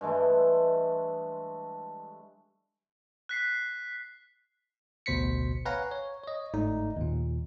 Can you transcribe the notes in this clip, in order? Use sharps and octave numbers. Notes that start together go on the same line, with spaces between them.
G2 E3 G#3 A3
F#6 B6 C7
A1 D2 B2 C5 B6 C#7
B4 C#5 F5 F#5 G#5 A#5
C#5
C#5 D#5
G1 G#2 A3 D#4 D5
D#2 A#2